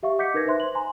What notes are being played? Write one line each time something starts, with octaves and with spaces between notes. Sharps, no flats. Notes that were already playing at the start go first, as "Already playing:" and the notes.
G4 E5 F5 C#6
D#5 F#5 D6 G6 B6 C#7
D#4 A#4 B4 G#6 A#6
D#4 B4 C5 E5 C6 F#6
C5 F#7
G#5 A#5 C6